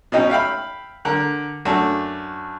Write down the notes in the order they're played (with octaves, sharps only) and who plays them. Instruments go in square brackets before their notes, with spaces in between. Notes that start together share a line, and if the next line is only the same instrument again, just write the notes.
[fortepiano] B2 C#4 D#4 G5
E5 F5 G5 B5
D3 A#4
F#2 A3 D4 F#4